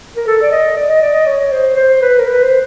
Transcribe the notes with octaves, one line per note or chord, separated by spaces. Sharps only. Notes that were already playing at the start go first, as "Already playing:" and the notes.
A#4
A4
D5
D#5
D5
D#5
D5
D#5
C#5
C5
C5
B4
A#4
B4
C5